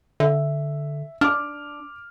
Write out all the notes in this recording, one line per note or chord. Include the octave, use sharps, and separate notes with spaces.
D3 E5
D4 D6 F6